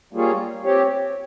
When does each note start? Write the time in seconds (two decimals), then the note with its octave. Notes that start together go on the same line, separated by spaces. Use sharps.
0.13 G3 A#3 F4 G#4 C#5
0.64 C4 G4 C#5